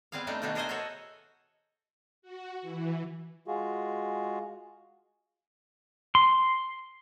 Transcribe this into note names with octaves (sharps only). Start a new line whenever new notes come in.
G3 B3 C4 G#4 F5
G3 A3 D4 D#4
B2 D#3 A3 D4 F#4
G#4 A#4 C5 D#5 E5 G#5
F#4 A4 C#5 F#5
F#4
E3
G#3 F4 F#4 G#4
C6